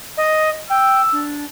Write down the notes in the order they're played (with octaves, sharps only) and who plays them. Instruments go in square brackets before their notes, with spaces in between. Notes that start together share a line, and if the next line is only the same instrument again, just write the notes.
[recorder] D#5
[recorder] G5 [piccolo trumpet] E6
[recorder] D4